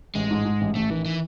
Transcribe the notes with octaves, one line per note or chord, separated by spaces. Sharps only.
A1 G#3
G#2
G#2
A1
A1 A3
D#3 E3
E3